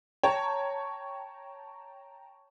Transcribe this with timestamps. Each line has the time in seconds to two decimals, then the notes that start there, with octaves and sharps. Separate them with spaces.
0.23 C#5 G5 A5 A#5